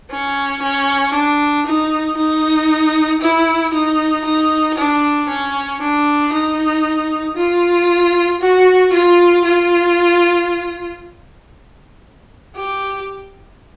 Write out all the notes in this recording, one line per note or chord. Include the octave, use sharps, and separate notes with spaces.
C#4
C#4
D4
D#4
D#4
E4
D#4
D#4
D4
C#4
D4
D#4
F4
F#4
F4
F4
G4